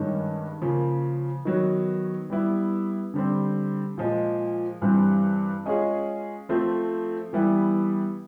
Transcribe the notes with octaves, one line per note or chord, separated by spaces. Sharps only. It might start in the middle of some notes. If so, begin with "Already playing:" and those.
Already playing: G2 D#3 G#3 C#4
C#3 F3 A#3
D#3 F#3 B3
G3 B3 E4
D3 G3 C4
A#2 F3 G#3
G2 E3 G3 C4
G#3 C#4 F4 G#4
F3 A3 C4
E3 G3 B3 E4